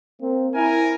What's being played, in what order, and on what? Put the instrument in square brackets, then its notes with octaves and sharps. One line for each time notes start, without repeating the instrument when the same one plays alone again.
[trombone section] A#3 C4
[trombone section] E4 [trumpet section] A#4 G#5